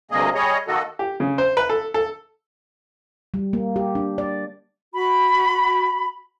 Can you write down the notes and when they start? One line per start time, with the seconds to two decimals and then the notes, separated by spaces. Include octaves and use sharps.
0.11 D2 G2 C3 A#3 G#4 D#5
0.35 G3 G#4 C#5 D#5
0.68 D#3 A#3 F#4 A4 D#5
0.99 G4
1.20 C#3
1.38 C5
1.57 B4
1.69 A4
1.94 A4
3.34 G3
3.53 A#3
3.76 G4
3.95 D4
4.18 D5
4.94 F#4 B5